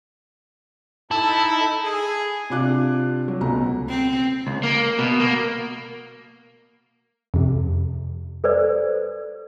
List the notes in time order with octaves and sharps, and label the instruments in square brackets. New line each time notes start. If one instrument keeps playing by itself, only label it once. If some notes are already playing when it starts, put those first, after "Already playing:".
[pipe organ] D#4 A4 [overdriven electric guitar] E4 [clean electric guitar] A5
[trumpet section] G#4
[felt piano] C3 D4 F4 D6 F#6
F#3
C#2 B2 A3 A#5
[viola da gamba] C4
[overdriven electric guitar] C#2
A#3
B2
A#3
[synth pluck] F2 C3
[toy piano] A4 B4 C5 D5